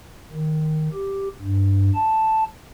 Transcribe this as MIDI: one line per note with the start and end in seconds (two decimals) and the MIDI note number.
0.32 0.89 51
0.93 1.28 67
1.41 1.91 43
1.95 2.44 81